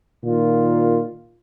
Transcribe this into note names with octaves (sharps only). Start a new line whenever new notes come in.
A#2 D#3 F4